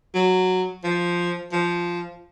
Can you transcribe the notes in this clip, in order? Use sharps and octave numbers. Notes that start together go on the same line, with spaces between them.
F#3
F3
F3